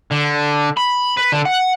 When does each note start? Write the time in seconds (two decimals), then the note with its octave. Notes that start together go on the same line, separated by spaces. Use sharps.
0.12 D3
0.77 B5
1.17 B4
1.32 D3
1.46 F#5